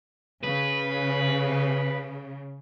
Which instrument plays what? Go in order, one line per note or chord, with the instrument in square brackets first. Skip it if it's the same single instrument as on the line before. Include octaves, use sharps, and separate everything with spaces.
[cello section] C#3 [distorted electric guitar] B4